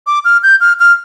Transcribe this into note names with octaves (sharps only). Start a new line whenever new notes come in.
D6
F6
G6
F6
F6